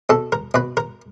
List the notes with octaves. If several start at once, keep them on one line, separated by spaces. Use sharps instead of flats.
B2 A4
A#4
B2 B4
A#4